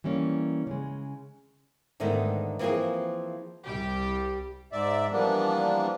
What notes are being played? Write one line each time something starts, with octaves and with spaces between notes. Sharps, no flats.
E3 G3 A#3 C#4
C#3 G#3
G#2 D3 D#3 G#3 A3 B3
E3 F3 A#3 C4 G#4
C2 G3 G4
G#2 D5 E5
E3 F3 G3 A#3 B3 D4